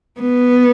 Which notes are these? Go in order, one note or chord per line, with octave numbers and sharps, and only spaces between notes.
B3